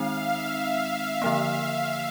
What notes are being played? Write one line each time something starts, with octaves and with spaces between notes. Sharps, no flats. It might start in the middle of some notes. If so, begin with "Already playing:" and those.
Already playing: D#3 G#3 C4 D#4 F5
E5
D3 F3 A#3